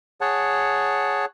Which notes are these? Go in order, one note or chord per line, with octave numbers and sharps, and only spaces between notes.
G#4 C#5 F#5 A5